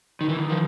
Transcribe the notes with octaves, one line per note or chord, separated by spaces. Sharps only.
D#3
E3
D#3
F3